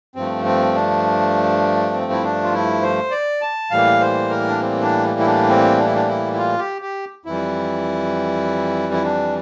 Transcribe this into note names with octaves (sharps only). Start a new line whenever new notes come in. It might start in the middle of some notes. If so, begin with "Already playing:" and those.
G2 F3 A3 C4
C4
D4
C4
E4
D4
F4
E4
C5
D5
A5
A2 E3 G3 A#3 F5
C5
A#4
D4
C4
D4
E4
D4
C4
D4
E4
D4
E4
E4
F4
G4
G4
F2 E3 G3 E4
E4
D4